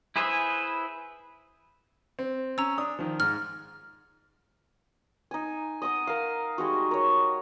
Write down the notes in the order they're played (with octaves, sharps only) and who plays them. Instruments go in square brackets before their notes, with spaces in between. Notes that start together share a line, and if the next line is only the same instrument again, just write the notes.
[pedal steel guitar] E4 G#4 B4 C5 E5
[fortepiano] C4
[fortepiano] C#4 [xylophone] A#5 E6
[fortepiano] D4 D#6
D#3 F3
[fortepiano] G#2 [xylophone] F6
[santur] D#4 G#5
D#5 F#5 D#6
A#4 F5
G3 G#3 D#4 F#4
A#4 C#5